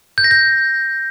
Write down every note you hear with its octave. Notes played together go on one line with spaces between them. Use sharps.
G6
A#6
G6